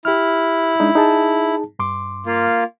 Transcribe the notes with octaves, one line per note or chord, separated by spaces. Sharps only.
E4 G4 F6
G#3 D4 D#4
D#4 G#4 A5
G2 C6 D6
A#3 F4